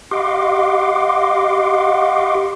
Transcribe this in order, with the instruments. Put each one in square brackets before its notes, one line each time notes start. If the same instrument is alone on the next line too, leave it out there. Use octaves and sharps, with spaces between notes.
[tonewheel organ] G4 D#5 F5 F#5 C6 D6